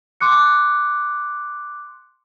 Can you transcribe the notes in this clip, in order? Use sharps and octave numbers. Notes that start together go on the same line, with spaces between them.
C6 D6 F#6 C#7